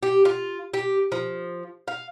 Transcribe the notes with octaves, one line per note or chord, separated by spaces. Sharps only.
G4
F4
G4
F3
F5